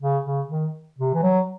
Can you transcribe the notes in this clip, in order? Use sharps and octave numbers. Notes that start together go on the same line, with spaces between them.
C#3
C#3
D#3
C3
E3
F#3